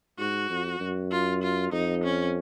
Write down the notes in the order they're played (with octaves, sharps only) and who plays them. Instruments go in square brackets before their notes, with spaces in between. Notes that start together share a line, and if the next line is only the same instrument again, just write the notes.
[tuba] G#2 [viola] F#4
[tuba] F2
F#2
[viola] F4
F4
[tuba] F2 [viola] D#4
[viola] C#4